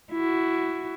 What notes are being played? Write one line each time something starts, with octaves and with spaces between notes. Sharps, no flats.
E4 F#4